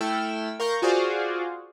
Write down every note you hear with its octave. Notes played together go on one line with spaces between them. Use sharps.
A3 E4 A4 G5 E6 F6
A#4 F5 C#6 G6 A#6
F4 F#4 G#4 C5 D5 F5